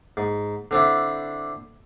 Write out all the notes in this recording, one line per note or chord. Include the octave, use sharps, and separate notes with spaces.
G#2
D3 C4 D4 E4